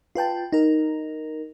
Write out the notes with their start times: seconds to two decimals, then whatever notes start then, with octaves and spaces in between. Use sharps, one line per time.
0.15 F4 B4 G5 A5
0.53 D#4 A#4